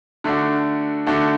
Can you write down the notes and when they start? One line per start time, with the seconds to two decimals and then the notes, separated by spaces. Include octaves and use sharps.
0.24 D3 A3 D4 F#4
1.07 D3 A3 D4 F#4